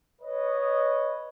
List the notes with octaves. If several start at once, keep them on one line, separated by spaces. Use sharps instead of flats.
B4 C#5 D#5